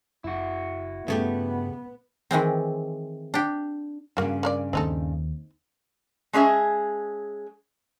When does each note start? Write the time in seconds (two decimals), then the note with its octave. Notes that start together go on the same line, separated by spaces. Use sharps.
0.24 F#1 E4 F#4
1.08 G2 C#3 A3 B3 G4
2.31 D#3 E3 G#3 C4
3.34 D4 G4
4.17 G2 C#3 A#3 F#4
4.43 A#3 A#4 D5
4.73 D#2 C4 D#4 A4
6.33 G#3 C#4 G#4 E5 A5